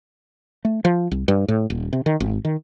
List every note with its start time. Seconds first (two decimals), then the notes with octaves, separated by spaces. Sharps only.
0.65 A3
0.85 F3
1.11 C2
1.28 G2
1.48 A2
1.70 D#1
1.93 C3
2.06 D#3
2.20 G#1
2.45 D#3